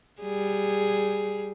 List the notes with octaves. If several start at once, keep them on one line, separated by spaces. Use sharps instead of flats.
G3 G#4